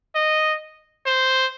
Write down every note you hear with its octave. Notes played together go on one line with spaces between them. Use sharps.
D#5
C5